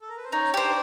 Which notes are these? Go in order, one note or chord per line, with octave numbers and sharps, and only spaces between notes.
A4
A#4
B4
C5
C#4 D#4 C#5
D4 G4 C5 D5